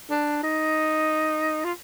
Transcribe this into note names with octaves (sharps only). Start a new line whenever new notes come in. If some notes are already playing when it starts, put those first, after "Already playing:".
D4
D#4
F4